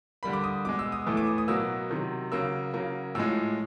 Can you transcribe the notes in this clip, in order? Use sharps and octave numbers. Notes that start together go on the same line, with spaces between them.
D3 G3 A#3 B5
D6
D#6
B2 G#3 D6
E6
D#6
A2 E3 A3 D6
D6
D#6
D#6
B2 F#3 A#3 E6
C3 D#3 F#3
C#3 F#3 A#3 E6
C#3 F#3 A#3
A2 F3 G#3 E6